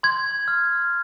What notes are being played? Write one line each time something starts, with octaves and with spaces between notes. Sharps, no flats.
C6 G#6
F6